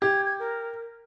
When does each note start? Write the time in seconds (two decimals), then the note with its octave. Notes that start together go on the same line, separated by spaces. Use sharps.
0.02 G4 G#6
0.25 G#6
0.39 A#4